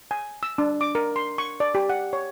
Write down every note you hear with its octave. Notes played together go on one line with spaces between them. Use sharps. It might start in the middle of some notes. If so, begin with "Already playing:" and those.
G#5
E6
D4
D6
A#4
C6
C#6
D5
G4
F#5
C#5